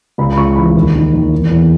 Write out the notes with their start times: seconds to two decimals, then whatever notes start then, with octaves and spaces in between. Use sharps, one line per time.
0.18 C#2 B5
0.32 B5
0.37 C#2 C#6
0.56 E3 B5
0.75 D#2
0.94 D#3
1.13 D#2
1.32 E2
1.51 E2